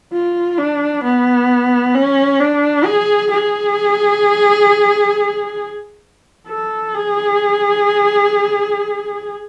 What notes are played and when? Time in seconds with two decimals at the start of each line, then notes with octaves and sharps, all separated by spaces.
0.13 F4
0.58 D4
1.04 B3
1.94 C#4
2.40 D4
2.85 G#4
3.31 G#4
6.47 A4
6.94 G#4